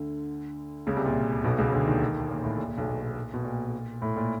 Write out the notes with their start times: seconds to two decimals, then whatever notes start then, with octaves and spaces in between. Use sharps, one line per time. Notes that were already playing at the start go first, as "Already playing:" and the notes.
Already playing: D2 D3
0.87 C#2 C#3
0.96 C2 C3
1.06 A#2
1.44 B1 B2
1.58 C#2 C#3
1.73 D2 D3
1.87 D#2 D#3
2.30 A#2
2.44 A2
2.58 A#2
2.69 A#2
2.78 B1 B2
2.87 A#2
3.34 B2
3.44 A#2
4.02 A2
4.17 A#2